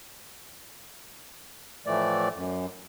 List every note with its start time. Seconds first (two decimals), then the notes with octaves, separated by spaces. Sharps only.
1.86 A2 E3 F3 A3 D5
2.36 F#2